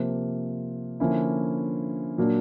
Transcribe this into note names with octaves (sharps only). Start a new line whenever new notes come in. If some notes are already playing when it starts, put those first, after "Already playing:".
Already playing: C3 F3 A#3
D3 F3 A#3 C#4 E4
A#2 F#3 A#3 D4